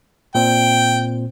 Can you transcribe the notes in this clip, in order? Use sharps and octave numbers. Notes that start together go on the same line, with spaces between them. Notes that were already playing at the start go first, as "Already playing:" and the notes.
A#2 C4 G5